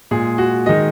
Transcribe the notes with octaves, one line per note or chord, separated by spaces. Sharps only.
A#2 G#3 G#4
F#4
D#3 G#3 D#5